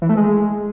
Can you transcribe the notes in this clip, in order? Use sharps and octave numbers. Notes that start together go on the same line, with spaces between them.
E3
A3
G#3